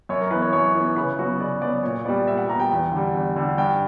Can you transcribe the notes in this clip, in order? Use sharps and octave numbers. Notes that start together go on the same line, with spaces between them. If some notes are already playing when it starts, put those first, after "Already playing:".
F#2 C#5
A#4
E3 B3 B4
C#5
F#2 C#5
E3 B3
C#3 B4
E4
F#3 B3 F#4
C#3 D5
F#3 B3 D5
A#2 C#5
G3 B3 D5
A#2 E5
F#5
G3 B3 A#5
G5
E2
D3 G3
E2
D3 G3
G2 G5